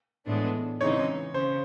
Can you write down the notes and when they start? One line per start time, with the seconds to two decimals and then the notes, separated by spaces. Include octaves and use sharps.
0.26 A2 E3 G#3 B3 D4
0.81 C#3 E3 G#3 C4 D#4 C#5
1.34 C#3 C5